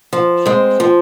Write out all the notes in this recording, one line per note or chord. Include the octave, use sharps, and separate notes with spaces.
F3
G#3 C4
F3